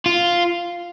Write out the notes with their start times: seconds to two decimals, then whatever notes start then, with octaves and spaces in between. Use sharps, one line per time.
0.06 F4